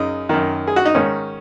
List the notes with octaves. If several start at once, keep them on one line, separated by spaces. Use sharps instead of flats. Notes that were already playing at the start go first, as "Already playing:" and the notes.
Already playing: F#2 C#3 D#4
F#2 D#3
G#4
F#4
D#4
G#2 D#3 C#4